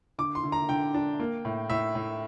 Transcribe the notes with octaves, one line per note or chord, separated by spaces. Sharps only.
D3 D6
C6
D3
A#5
D3 G5
D4
A#3
A2
A2 E5
A2